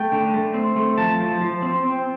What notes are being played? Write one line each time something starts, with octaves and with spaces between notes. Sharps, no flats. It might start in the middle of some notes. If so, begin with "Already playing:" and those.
Already playing: A3 G5
D3
A3
C4
A3
F3 A5
F3
F3
C4
C4